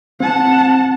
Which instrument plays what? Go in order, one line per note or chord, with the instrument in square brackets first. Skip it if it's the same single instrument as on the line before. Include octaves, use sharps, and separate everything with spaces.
[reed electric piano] C4 [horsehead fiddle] F#5 A5